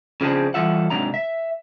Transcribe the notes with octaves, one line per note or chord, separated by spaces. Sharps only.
C#3 F3 C4 D4 G#4
E3 G3 A3 F4 E5 F#5
G#2 C3 F#3 D4 A#5
E5